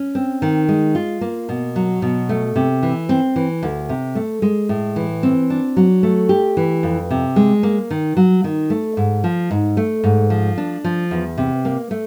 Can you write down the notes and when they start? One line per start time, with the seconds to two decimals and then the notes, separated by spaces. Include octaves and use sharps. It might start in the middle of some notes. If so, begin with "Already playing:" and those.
Already playing: C#4
0.15 C4
0.42 D#3
0.69 G#3
0.95 F4
1.21 A#3
1.49 B2
1.76 F#3
2.02 B2
2.29 A3
2.56 C3
2.82 E3
3.09 C4
3.36 E3
3.63 D2
3.89 C3
4.15 A3
4.42 G#3
4.69 A2
4.96 E3
5.23 C4
5.50 D4
5.76 F#3
6.03 A3
6.29 G4
6.57 E3
6.83 F2
7.10 C3
7.36 G#3
7.63 A#3
7.91 D#3
8.17 F#3
8.44 D#3
8.70 A3
8.97 G#2
9.24 F3
9.51 G#2
9.77 A3
10.03 G#2
10.30 F3
10.58 D4
10.84 F3
11.11 E2
11.37 C3
11.65 A#3
11.91 A3